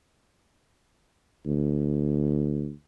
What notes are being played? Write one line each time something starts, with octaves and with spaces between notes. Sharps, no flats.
D2